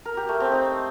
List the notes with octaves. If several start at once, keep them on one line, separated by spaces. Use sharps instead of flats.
A#4
G4
A3
C4
D#4